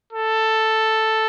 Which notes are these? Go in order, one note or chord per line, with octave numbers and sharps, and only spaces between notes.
A4